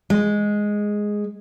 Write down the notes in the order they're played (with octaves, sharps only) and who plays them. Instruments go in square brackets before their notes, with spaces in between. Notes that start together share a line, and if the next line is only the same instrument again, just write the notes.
[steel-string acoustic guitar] G#3